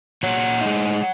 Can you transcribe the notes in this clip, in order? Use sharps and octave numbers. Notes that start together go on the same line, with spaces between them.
A#2 C#5 F#5
G#3 D#4